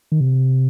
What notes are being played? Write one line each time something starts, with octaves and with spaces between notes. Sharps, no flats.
D#3
C3